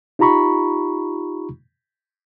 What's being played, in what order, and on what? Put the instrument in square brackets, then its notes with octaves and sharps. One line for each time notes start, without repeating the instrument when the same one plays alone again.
[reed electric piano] D#4 F4 G4 A#5 B5 C#6